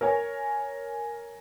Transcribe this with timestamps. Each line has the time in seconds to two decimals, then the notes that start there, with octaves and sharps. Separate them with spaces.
0.01 A#4 C#5 G#5